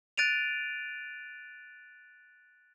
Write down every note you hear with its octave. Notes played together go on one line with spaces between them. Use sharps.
F#6 A6 D7 D#7 F7